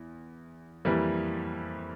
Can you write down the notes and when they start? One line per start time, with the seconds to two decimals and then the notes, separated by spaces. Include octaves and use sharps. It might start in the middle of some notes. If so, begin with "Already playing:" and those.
Already playing: E2
0.85 F2 E3 G3 A#3